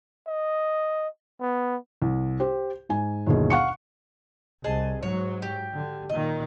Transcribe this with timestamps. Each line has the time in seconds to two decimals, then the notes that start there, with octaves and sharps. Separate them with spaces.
0.27 D#5
1.41 B3
2.02 C2
2.40 G4 C5
2.89 G#2 G#5
3.26 G1 D#2 B2 G#4
3.50 F5 F#5 C#6 C#7
4.64 C2 G#4 D#5 A5
5.03 G#2 F#3 C#5
5.42 G4 G5
5.76 D3
6.09 A#2 D#3 D#5